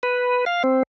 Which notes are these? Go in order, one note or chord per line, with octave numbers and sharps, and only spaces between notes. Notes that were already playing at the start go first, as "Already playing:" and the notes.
B4
F5
C4